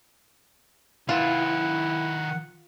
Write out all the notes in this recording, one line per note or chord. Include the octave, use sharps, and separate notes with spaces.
D#3 E4 F4 B4 F#5